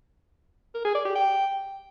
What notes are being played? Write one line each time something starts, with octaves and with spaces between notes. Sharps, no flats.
A#4
G#4
D5
G4
G5